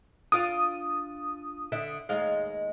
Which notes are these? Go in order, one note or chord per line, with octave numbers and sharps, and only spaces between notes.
D4 F4 F5 D#6
D3 E5
D#2 G#3 F5